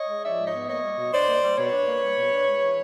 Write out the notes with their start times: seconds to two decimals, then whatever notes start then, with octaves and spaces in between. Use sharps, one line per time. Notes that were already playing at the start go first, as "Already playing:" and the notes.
Already playing: C#5 D#5
0.09 G#3
0.23 F3 D5 E5
0.39 G#2
0.46 C#5 D#5
0.54 B3
0.69 A#3 C#5 D#5
0.84 G3
0.98 B2
1.13 D4 C5 D5
1.28 A#3
1.43 G3
1.57 B2 B4 C#5
1.72 D4
1.88 A#3
2.02 G3
2.18 B2
2.32 D4
2.47 G#3
2.62 E3